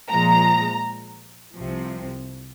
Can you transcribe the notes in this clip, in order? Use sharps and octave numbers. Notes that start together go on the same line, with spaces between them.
A#2 F3 G#3 A#5
C2 C3 F3